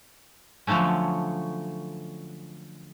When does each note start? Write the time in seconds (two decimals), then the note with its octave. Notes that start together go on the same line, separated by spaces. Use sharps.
0.67 D3 F3 F#3 A3 C#4